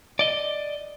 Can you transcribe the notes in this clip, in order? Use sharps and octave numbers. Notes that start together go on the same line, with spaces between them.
D5 D#5